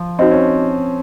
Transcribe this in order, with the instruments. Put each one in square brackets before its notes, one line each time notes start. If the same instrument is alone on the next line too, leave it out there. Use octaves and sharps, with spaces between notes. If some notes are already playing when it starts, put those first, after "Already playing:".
Already playing: [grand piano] F3
[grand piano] C4 [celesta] D#4 F#4 C5 D#5
[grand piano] C#4